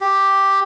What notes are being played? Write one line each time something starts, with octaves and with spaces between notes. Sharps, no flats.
G4